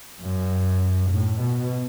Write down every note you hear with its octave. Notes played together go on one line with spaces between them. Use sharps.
F#2
A2
B2